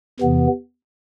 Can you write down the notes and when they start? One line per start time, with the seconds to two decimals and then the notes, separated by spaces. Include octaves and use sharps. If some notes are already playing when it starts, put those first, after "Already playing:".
0.20 E2 C3 E3 B3